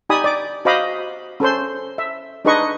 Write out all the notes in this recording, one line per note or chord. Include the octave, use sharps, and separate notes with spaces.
D#4 G4 D5 G#5 B5 D#6
D5 D6
F#4 C5 D#5 F5 B5 D6
C#4 A4 C5 C6
E5
D4 D#4 G#4 B4 D#5 C#6